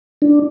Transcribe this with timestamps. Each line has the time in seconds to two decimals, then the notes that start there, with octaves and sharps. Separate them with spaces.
0.22 D4